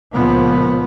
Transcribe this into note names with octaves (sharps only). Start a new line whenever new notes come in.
C#2 A#2 F3 B3